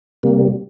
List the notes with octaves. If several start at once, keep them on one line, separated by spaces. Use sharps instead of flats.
C3 G3 A#3